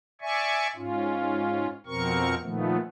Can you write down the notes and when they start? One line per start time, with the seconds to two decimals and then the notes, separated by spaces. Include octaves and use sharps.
0.21 D5 E5 G#5 C#6
0.76 G#2 C#4 F4
1.86 F2 B2 C4 A#4 C#6
2.43 A#2 D#3 F3 A3 B3